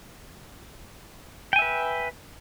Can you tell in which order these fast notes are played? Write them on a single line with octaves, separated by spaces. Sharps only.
G5 G#5 E5 B4